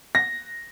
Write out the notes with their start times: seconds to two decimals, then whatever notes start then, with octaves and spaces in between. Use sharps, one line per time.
0.15 A#6